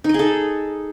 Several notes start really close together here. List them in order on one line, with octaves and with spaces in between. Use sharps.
D#4 D#5 G#4 A4